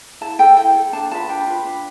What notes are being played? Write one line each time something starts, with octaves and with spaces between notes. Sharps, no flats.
E4 A5
A4 G5
E4 G5
A4
D4 A5
F4 B4 A5
D4 G5
F4 B4
D4